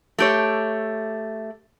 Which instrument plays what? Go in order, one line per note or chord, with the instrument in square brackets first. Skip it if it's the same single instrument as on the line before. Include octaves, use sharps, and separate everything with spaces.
[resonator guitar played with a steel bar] A3 G4 C#5